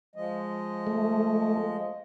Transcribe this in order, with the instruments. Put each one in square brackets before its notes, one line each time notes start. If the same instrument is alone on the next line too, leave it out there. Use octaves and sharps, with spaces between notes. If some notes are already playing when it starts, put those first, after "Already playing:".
[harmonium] F3 G#3 D#5
[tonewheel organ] A3